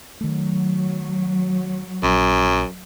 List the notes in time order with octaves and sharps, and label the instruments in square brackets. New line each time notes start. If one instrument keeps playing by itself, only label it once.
[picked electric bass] D#3 A3 [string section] F#3
[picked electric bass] A#1 [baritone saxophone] F#2